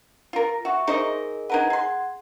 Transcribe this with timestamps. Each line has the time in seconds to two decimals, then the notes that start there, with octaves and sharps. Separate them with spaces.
0.33 F4 A#4
0.65 F#4 E5 C#6
0.87 D#4 G#4 A#4 C5 D#5
1.50 D#4 A#4 B4 F#5 G#6
1.70 G#4 C6